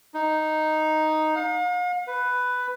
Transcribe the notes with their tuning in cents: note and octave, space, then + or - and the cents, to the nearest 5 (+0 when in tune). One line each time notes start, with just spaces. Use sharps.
D#4 +0
F5 +45
B4 +10